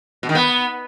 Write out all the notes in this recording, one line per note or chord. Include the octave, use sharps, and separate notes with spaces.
B2
D#3
B3